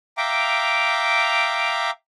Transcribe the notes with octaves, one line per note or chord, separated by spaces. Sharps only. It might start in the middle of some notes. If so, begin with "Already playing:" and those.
E5 F5 G5 A#5 D6